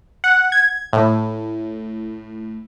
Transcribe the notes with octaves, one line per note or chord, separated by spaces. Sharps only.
F#5
G#6
A2